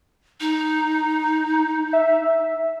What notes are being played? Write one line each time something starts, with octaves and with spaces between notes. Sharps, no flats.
D#4
E5